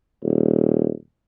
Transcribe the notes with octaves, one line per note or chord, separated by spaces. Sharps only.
D#1